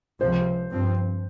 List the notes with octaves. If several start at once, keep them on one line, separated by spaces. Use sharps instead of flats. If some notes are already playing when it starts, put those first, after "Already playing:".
C#2 C3 F3 C5
G2 F3 C4